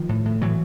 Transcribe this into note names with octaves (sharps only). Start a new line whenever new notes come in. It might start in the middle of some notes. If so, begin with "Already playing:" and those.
Already playing: D#3 F3
A2
A2
A2 E3 F#3